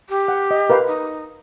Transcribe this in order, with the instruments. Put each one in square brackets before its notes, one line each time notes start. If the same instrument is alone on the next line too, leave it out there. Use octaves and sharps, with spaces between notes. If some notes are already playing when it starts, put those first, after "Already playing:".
[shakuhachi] G4
[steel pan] F#5
D#5
A#4 B4 F5
[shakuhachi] D#4